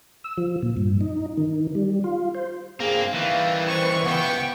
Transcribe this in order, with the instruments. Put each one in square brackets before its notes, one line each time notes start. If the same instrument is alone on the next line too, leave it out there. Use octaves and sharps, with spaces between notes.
[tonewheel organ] E6
F3
A#2
G2
D#4
D#3
G3
F4
C5
[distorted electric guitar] G2 C4 [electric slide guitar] A#3 [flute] G#4
[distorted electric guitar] D#3 G3 [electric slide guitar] E3 [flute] F5
[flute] C5 [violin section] C#6
[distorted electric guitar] C#2 G4 [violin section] B3 G5 C#6 [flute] F#5